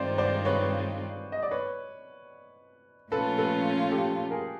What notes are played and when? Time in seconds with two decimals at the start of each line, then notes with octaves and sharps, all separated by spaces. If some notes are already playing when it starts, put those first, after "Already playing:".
Already playing: G2 D#3 G#3 C4 F4 C5 D5
0.18 C5 D5
0.45 B4 C#5
1.32 D#5
1.43 D5
1.51 B4 C#5
3.11 A#2 F3 A3 C#4 F4 A4 B4
3.38 A4 B4
3.91 G4 A4
4.31 G#4 A#4